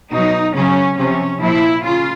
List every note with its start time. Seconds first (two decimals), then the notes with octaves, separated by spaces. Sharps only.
0.11 B2 F#3 D#4
0.54 C#3 F#3 C#4
0.97 C3 F3 C#4
1.40 A#2 F3 E4
1.83 C#3 F4